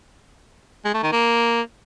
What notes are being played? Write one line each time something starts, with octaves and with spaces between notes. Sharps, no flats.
G#3
A3
D#3
A#3